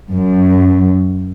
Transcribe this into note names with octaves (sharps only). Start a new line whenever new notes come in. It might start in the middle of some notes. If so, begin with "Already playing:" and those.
F#2